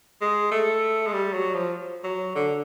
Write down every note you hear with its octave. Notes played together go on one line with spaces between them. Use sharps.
G#3
A3
G#3
G3
F#3
F3
F#3
D3